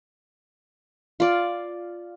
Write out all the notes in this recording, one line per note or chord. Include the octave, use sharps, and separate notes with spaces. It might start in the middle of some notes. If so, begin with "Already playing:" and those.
F4 D5